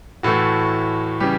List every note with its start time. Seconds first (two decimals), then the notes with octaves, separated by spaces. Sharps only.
0.23 A2 E3 A3 F#4
1.20 C#3 E3 G3 G4